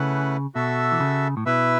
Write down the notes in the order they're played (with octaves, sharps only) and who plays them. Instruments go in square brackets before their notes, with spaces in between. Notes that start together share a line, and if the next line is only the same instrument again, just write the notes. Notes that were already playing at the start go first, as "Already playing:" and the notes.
Already playing: [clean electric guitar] C#3 [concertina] A3 C#4 E4 B4 F#5
[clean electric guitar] B2 [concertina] F#4 A4 E5
[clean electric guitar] E3
C#3
A2
[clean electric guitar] B2 [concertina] E4 B4 E5